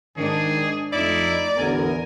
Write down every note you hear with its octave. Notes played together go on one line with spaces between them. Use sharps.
G#2 D#3 D4 G#4
F2 A3 D#4 E4 D5
A1 E2 D3 B3 A#4 G#5